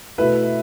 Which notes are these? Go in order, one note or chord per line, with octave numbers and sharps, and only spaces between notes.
B2 A3 E4 B4 E5